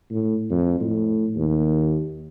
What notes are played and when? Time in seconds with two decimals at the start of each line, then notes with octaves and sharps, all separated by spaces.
0.11 A2
0.50 F2
0.81 A2
1.36 D#2